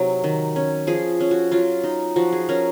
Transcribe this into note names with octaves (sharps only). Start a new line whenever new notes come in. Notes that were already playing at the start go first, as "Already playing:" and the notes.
Already playing: C3 F#3 D#4
D#3
C#4
F3 G#4
C#4
F#4
F#3 F4
D#4
F3 F#4
G#4
C#4 A#4